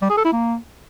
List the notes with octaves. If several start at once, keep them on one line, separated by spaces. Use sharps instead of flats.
G3
G#4
A4
E4
A#3